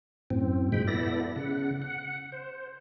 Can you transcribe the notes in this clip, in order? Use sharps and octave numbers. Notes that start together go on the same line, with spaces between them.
F#2 A2 C4
G2 B2 F3 G#3 G5 B5
B3 E4 A4 D5 B5 A#6
C#3 F#5
F#5
C5